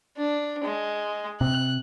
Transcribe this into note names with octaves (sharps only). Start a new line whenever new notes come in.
D4
G#3
C3 F#6